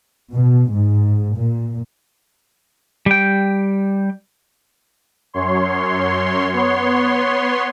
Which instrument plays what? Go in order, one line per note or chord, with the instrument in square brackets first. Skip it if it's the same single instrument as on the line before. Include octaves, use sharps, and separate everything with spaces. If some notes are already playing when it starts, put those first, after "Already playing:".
[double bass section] B2
G#2
A#2
[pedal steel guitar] G3 G5
[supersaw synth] F#2 C#5 C6
B3 C#5 C6